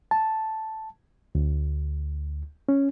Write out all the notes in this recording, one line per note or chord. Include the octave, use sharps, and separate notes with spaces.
A5
D2
C#4